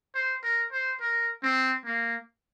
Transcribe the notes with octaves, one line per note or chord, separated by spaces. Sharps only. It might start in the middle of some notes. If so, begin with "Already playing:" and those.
C5
A#4
C5
A#4
C4
A#3